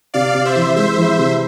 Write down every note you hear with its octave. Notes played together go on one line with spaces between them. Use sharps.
C3 D5 F5
C3
C5 E5
E3
G#3 C5 E5
E3
C3